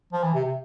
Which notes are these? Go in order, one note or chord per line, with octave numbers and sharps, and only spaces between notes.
F3
E3
C3
C3